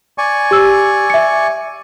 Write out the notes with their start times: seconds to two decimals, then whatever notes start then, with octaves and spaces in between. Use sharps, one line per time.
0.18 D5 G#5 C#6
0.51 G4 E6
1.10 E5 C#7